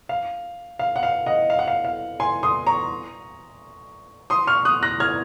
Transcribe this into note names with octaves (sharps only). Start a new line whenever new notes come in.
F5
F5
F#5
F5
D#5 F#5
F5
F#5
F5
F5
G#5 C6
C6 D#6
A#5 C#6
C6 D#6
C#6 F6
D#6 F#6
F#6 A#6
F6 G#6